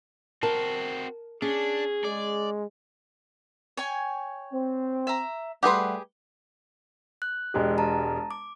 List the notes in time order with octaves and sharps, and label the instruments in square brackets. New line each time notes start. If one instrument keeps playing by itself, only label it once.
[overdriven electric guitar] C4 F#4 [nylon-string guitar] A#4 A5
[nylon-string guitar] C#4 [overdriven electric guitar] D4 [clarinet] G#4
[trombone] G#3 [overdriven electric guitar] D5
[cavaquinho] C#5 G5 G#5
[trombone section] C4
[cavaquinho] E5 A#5
[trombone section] G3 A3 [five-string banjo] G4 G#4 B4 [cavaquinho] F#5 C6
[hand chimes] F#6
[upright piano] E1 G#3 G4
[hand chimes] A5 A#5
D6